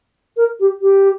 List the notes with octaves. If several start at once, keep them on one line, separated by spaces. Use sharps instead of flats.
A#4
G4
G4